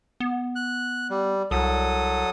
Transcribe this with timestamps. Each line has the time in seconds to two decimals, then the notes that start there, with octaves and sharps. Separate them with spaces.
0.20 B3
0.56 F#6
1.10 G3
1.51 C2 F#3 A4 D#6